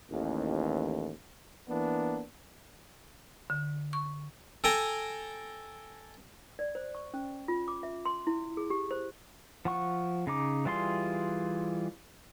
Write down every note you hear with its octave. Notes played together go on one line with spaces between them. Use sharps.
A1 D#2
E3 A#3 B3 D4
D3
C#6
A4 G5 G#5 A#5
D5
C5
C#6
C#4
F4
D6
E5
C6
E4
G#4
G4
C5
F3 F#5 C#6
C#3 D#4 D6
E3 G3 F4 G#4 C6